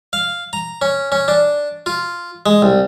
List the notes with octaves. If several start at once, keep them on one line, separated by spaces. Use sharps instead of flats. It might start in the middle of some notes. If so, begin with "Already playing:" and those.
F5
A#5
C#4
C#4
D4
F4
G#3
C2